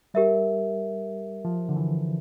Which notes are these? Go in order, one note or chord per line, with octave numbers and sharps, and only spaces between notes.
G3 G4 A#4 E5
F3
D3
E3